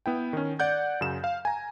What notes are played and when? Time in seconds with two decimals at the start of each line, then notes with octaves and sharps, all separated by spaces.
0.06 B3 E4 G5
0.33 D#3 C#4
0.59 D5 F#5 G6 G#6
1.01 F#2 C#3 E7
1.24 F5
1.45 G#5 A#5